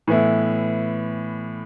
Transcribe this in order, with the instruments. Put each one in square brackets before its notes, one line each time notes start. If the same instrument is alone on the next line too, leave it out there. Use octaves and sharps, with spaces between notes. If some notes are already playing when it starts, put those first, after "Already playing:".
[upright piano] A2 E3 B3 E4